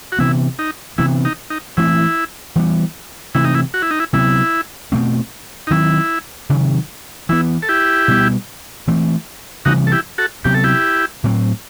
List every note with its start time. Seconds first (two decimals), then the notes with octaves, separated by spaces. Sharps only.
0.12 F#4
0.19 C3 E3 B3 E4
0.59 D#4
0.98 C3 E3 B3 E4
1.25 D#4
1.50 D#4
1.77 E3 A3 C4 E4
2.56 E3 G3 B3
3.35 C3 E3 A3 E4
3.45 D#4
3.55 E4
3.74 F#4
3.82 E4
3.91 D#4
4.00 E4
4.13 C3 F#3 B3 E4
4.92 B2 A3 C4
5.67 D#4
5.71 D#3 F#3 C4 E4
6.50 C3 D#3 F#3
7.29 E3 B3 E4
7.63 A4
7.69 E4 G4
8.08 B2 G3 B3
8.87 E3 A3 C4
9.65 C3 E3 G3 B3 D#4 F#4
9.87 A4
9.92 E4 G4
10.18 F#4 A4
10.44 C3 F#3 B3 G4
10.54 A4
10.64 E4 G4
11.24 A2 F#3 C4